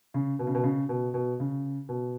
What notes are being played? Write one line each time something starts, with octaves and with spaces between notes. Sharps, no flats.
C#3
B2
C#3
B2
C#3
B2
B2
C#3
B2